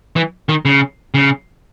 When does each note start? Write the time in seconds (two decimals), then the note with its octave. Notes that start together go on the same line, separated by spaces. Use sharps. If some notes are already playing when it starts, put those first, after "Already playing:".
0.16 E3
0.49 D#3
0.65 C#3
1.14 C#3